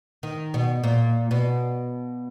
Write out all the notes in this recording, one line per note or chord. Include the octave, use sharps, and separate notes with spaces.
D#3
B2
A#2
B2